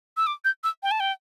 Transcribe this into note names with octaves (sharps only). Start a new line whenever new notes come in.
E6
D6
G6
E6
G5
A5
G5